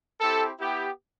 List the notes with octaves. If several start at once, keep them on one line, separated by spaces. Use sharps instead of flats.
C4 E4 G4 A4
B3 E4 G4